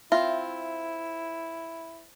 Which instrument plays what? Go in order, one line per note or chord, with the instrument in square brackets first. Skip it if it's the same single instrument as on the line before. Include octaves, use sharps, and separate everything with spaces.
[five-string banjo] C4 F4 [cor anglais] E4 [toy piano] E5